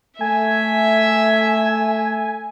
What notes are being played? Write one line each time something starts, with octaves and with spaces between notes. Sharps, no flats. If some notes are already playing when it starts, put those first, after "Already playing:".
A3 E5 G#5